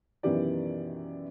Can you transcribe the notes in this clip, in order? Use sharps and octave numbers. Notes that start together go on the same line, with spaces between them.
F#2 B2 D#3 E3 G4 D5